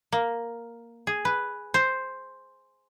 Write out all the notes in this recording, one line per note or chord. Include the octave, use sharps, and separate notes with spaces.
A#3
G#4
B4
C5